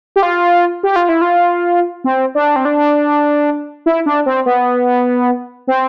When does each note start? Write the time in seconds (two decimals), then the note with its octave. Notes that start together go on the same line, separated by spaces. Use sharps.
0.16 G4
0.23 F4
0.83 G4
0.96 F4
1.09 E4
1.21 F4
2.04 C4
2.35 D4
2.56 C4
2.65 D4
3.86 E4
4.06 D4
4.26 C4
4.46 B3
5.67 C4